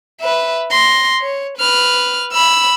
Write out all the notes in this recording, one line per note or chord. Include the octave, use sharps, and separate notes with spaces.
B4 E5
C6 A#6
C#5
B4 F6
B5 E6